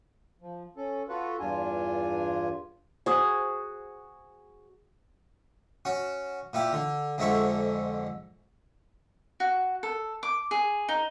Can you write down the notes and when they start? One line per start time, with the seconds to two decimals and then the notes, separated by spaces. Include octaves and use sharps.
0.41 F3
0.77 C#4 A4
1.09 F4 F#4 A4 B4
1.39 E2 G2 D4 F4 G#5
3.06 F#4 G#4 C5 C#6 D#6
5.85 C#4 F#4
6.53 A#2 E4 G4
6.73 D3
7.18 F2 G#2 D3 E5 C#6
9.40 F#4
9.83 A4
10.23 D6
10.51 G#4
10.89 D#4